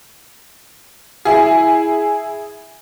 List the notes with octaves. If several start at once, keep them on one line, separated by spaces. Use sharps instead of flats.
E4 G#4